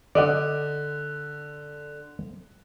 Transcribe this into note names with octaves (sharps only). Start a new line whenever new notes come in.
D3 D5 D#5 F#5